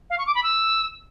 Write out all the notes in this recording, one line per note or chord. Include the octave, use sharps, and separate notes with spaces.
F5
C#6
D6
B5
E6